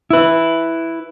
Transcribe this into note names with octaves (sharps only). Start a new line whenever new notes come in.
E4 B4